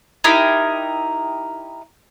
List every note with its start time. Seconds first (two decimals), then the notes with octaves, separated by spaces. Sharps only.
0.24 D#4 E4 G4 A#4